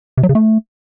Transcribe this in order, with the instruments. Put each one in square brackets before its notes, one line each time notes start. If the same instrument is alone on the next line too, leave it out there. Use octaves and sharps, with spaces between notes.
[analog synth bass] C3
F#3
C#3
A3